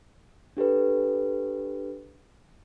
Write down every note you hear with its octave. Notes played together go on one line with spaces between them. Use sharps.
D4 G4 A4 B4